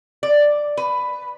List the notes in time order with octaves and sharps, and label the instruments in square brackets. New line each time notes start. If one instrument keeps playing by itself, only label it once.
[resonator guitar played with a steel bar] D5
B4